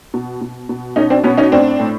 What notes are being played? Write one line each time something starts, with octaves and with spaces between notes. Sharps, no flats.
B2
B2
B2
B2 C#4 D#4
C4 D4
B2 B3 C#4
C#4 D#4
A2 C4 D4
A2